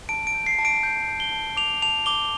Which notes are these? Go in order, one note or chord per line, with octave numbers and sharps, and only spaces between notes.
A5 D7
D7
G6
C7
A5
D7
G6
G6
G7
A5
D6 F7
A5 F7
D6 G7